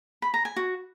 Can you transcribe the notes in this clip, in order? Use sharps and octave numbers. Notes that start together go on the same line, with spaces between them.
B5
A#5
G#5
F#4